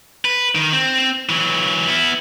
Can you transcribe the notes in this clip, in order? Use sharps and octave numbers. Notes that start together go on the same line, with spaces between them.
B4
D#3
C4
E3 F#3
B3 E4